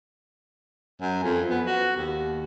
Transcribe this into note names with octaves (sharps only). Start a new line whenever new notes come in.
F#2
F2
B3
F#4
D#2